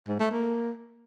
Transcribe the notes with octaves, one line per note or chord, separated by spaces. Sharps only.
G#2
A3
A#3